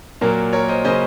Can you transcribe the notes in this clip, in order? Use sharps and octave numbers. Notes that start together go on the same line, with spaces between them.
A#2 F#3 A#3 A#4
A#4 C#5
C5 D#5
C#3 F#3 A#3 C#4 C5 D#5